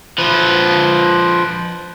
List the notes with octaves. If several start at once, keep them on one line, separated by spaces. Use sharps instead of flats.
F3 B4